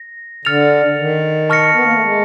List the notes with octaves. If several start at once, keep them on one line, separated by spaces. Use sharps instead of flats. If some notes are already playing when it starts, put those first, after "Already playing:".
Already playing: A#6
D3 F6 A6 C#7 F7
D#3
A5 C#6 F6 A#6 C#7
B3
A#3
A3
G#3